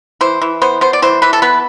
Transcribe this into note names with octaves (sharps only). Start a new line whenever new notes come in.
E3 C5
E3
B3 C5
B3 C5
D5
E3 C5
E3 B4
A4
B3 B4